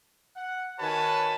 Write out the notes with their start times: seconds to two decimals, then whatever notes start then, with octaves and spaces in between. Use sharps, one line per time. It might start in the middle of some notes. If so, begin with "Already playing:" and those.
0.36 F#5
0.80 D#3 F#4 B4 C#5 G#5 A5